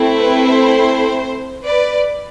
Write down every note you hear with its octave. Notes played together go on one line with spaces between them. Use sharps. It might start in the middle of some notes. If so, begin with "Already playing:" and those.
Already playing: A3 C4 E4 A4
B4
C5
B4 D5